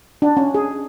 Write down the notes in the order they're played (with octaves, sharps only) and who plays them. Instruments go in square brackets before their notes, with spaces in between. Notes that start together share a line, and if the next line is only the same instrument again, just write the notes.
[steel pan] D4
C#4
G#4